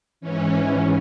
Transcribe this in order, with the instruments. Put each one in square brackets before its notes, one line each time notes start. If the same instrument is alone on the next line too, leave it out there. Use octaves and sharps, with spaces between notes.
[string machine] G#2 E3 C#4